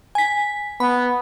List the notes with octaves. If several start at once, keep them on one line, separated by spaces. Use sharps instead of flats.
G#5 B6
B3 B5